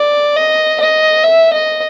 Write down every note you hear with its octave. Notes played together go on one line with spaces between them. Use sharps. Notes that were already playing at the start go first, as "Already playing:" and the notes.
Already playing: D5
D#5
D#5
E5
D#5